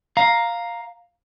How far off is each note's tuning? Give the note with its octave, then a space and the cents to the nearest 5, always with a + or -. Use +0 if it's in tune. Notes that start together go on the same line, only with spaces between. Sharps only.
F5 +5 A#5 +0